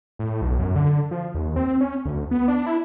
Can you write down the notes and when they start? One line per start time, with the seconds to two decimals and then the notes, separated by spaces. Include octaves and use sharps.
0.19 A2
0.41 B1
0.59 F#2
0.76 D3
1.11 F3
1.34 D#2
1.56 C4
1.81 C#4
2.05 D2
2.31 B3
2.48 D4
2.66 E4